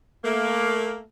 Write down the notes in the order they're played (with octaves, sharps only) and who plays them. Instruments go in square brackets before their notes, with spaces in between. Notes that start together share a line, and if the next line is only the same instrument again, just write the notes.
[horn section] A3 A#3